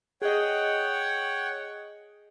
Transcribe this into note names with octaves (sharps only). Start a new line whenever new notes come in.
G#4 C#5 D#5 F#5 G5